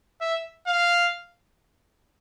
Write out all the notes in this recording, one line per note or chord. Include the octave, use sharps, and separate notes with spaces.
E5
F5